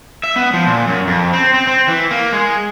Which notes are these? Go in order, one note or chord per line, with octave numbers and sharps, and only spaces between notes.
E5
B3
F3
A#2
F#2
F2
C4
C4
C4
E3
A#3
G#3